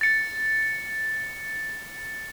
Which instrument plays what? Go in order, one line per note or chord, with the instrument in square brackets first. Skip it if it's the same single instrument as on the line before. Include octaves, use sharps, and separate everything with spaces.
[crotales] A6 C#7